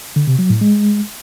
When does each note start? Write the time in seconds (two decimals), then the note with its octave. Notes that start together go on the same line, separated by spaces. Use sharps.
0.16 D3
0.27 C3
0.39 F#3
0.50 A2
0.61 G#3